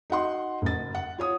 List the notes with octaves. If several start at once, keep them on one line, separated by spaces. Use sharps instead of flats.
D#4 F#4 F#5 C6
F#1 A6
F#5
F4 C#5 D#6